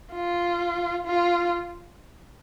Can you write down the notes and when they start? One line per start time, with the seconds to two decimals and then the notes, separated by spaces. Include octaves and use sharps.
0.12 F4
1.06 F4